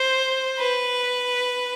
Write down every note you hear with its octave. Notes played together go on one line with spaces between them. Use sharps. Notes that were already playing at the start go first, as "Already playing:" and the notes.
Already playing: C5
B4